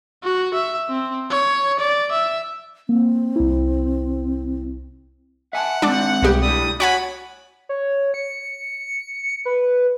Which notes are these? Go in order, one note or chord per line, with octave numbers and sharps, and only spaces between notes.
F#4
E5
C4
C#5
D5
E5
A#3 C4
C2 E4
E5 F#5 G#5 A5
G#3 C4 D4 D5
C2 B2 G4
A2 D3 G3 D#6
F#4 C#5 F#5 G#5 B5
C#5
C#7
B4